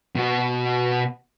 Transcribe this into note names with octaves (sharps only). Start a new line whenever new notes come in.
B2 F#4